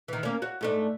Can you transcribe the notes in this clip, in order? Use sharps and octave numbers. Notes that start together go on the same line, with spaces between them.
D#3 E3
A#3 C#4
F#4 C#5
G#2 A3 D4